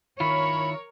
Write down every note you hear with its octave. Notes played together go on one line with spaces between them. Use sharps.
D#3 E4 F4 A#4 C#5 B5